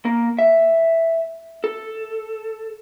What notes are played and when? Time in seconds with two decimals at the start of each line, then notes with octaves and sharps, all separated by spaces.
0.05 A#3
0.39 E5
1.64 A4